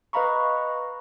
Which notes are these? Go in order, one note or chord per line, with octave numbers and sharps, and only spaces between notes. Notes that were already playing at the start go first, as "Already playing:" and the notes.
B4 D#5 F5 A#5 B5 C#6